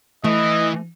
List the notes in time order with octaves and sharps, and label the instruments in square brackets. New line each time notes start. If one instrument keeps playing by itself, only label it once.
[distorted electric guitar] E3 [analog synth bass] A3 [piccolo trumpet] D#5